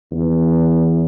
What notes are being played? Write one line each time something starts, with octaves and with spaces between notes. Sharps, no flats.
E2